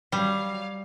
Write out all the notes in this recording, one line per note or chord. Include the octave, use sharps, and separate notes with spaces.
F#3 G3 F5